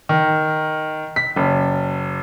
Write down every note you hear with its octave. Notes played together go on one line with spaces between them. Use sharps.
D#3
B6
F#1